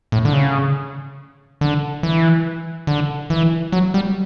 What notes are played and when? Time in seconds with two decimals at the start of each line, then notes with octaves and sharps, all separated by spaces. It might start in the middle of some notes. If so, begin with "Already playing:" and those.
0.12 A2
0.25 D3
0.33 C#3
1.61 D3
2.03 E3
2.87 D3
3.30 E3
3.72 F#3
3.94 G3